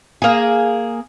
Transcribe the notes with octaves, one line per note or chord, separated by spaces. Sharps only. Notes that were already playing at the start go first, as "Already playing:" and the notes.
A#3 G#4